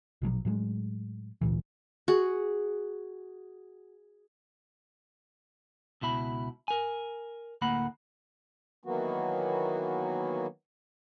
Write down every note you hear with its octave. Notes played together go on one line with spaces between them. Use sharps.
A#1 B2 F3 F#3
A2 F#3 G#3
G#1 D2 A#2 E3
F#4 G#4
C#2 B2 E4 B5
A#4 G#5
D2 A2 A#3 A#4 F#5 B5
D#3 E3 F#3 A#3 B3 F#4